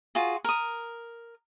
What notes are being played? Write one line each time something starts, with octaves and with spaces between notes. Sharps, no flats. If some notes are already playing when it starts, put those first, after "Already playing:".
F4 F#4 G#4
A#4 D#6